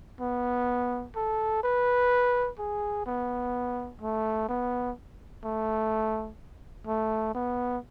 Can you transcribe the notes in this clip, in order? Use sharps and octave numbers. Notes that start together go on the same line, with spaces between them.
B3
A4
B4
G#4
B3
A3
B3
A3
A3
B3